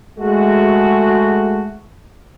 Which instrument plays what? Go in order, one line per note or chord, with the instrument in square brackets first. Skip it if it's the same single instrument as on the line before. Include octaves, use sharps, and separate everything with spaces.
[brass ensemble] G#3 A3 F#4